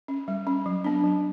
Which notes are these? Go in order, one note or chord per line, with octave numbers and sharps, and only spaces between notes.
C#4
G3
C#4
F#3
B3 D4
F#3